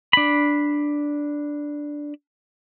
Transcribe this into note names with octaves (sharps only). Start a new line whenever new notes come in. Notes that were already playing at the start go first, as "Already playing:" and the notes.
D4 B5